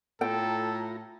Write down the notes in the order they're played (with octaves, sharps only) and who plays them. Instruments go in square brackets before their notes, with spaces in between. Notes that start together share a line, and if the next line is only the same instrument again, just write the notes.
[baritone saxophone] A2 [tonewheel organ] F4 A#5 [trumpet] A4 [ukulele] G5